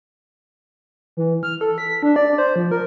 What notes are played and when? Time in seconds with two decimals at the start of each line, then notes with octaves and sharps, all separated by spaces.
1.17 E3
1.43 F6
1.61 A4
1.78 B6
2.03 D4
2.16 D5
2.38 C5
2.56 F3
2.71 A#4